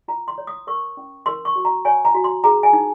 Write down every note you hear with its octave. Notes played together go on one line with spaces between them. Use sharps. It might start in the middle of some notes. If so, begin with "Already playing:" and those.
F4 A#5
C6
C#5
D#6
A#4 C#6
C#4
A#4 C6
C#6
F#4
A#5
C#5 G#5
A#5
F#4
C6
G#4 A#5
G#5
D#4